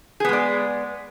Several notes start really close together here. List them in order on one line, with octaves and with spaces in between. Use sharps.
G#4 B3 G#3 D5